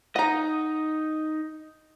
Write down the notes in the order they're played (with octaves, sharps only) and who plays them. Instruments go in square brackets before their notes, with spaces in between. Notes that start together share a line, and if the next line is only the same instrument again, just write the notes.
[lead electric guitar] D#4 D#5 [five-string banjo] F#5 A#5